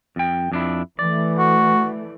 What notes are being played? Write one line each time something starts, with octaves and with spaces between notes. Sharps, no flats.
F2 G5
F2 D4 E4
E3 A3 D5
F#4